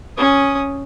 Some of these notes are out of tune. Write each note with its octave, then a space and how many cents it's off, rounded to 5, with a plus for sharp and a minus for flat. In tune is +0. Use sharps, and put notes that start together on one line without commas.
C#4 +0 D#6 +0